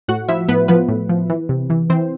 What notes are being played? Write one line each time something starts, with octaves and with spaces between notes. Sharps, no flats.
A2 F#4 F#5
F3 E4 E5
A2 B3 B4
F3 B3 B4
A2
F3
E3
C3
E3
E3 C4 C5